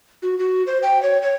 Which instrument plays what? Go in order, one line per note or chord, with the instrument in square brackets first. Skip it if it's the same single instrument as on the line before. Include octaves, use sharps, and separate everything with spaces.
[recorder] F#4
F#4
C5
G5
C#5
C#5